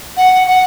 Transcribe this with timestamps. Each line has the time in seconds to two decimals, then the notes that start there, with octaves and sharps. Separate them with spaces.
0.17 F#5
0.47 F#5